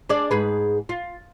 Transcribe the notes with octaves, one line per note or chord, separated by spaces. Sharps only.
D4 G#4 D5
G#2 G#4 B4
F4